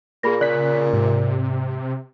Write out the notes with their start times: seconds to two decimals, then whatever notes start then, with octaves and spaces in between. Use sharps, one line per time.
0.23 A#2 A#3 G#4 B5 A#6
0.41 C#3 D5 F#6 B6
0.93 G#2 C3